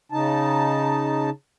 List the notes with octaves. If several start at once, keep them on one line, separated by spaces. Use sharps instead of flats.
C#3 D#4 A5